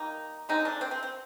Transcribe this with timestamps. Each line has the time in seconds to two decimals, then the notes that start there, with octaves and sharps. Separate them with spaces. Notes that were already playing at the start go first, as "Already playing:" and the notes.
Already playing: D#3 G3 A#3 D#4
0.49 D3 G#3 C4 D#4
0.65 D4
0.81 C4
0.91 C4
1.03 C4